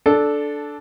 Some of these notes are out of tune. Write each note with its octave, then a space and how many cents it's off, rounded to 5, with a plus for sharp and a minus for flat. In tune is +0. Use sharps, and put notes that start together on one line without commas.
D4 +0 A4 -10